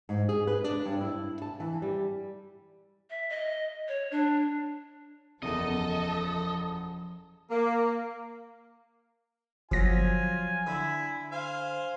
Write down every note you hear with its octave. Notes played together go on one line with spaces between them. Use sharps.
G#2
G#4
B4
D4
G2
E4
A5
E3
G3
E5
D#5
C#5
D4
F#1 E2 F3 A4 D#5 D#7
A#3
G1 F3 F#3 F4 G#5 A#6
D3 E4
C5 F5 G#5